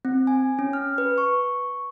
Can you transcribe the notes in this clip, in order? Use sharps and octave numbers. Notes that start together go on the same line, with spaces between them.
C4
G#5
C#4
F6
B4
C#6